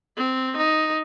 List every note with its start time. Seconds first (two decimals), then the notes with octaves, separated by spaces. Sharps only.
0.17 C4
0.57 D#4